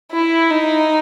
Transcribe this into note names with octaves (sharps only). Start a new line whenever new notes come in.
E4
D#4